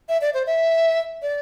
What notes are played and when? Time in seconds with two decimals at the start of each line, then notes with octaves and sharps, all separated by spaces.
0.09 E5
0.21 D5
0.34 C5
0.47 E5
1.22 D5